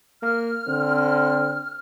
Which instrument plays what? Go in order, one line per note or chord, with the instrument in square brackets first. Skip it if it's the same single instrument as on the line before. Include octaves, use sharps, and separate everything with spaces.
[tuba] A#3 [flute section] F6
[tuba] D3 [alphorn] C4